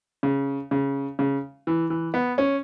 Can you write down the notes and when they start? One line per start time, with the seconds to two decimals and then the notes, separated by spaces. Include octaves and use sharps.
0.23 C#3
0.71 C#3
1.19 C#3
1.67 E3
1.90 E3
2.14 B3
2.38 C#4